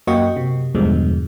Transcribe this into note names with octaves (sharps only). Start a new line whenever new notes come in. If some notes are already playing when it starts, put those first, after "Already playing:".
F#2 A#3 F#4 D#5 G5 C#6
C3
E2 G2 B2 D3 F3 G#3